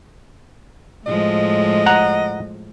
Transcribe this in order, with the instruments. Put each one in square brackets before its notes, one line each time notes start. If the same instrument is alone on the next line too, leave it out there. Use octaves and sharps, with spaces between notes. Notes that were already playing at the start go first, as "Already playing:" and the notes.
[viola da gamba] A2 F3 G#3 [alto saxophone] D#5
[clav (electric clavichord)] F#5 A#5